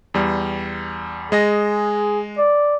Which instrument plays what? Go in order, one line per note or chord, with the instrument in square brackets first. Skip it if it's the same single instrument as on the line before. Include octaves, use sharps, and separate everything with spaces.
[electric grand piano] E2 G3
[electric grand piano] G#3 D#5 A#6 [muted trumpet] G#4
[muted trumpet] D5